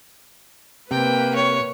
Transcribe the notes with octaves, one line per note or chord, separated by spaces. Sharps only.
C3 A#3 B4 G5
C#5